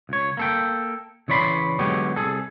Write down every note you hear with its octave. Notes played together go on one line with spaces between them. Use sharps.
C#2 C#5
A#3 A4 G5
C#3 E3 C#5 D5 B5 C6
D3 F#3 G#3 B3 G4 C#5
C2 G#4 A4